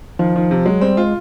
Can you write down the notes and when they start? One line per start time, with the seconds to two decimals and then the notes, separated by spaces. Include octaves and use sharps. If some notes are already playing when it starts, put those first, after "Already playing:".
0.19 D#3 F3
0.36 D#3
0.51 C3
0.66 F#3 G#3
0.81 G3 C4
0.97 G#3 F4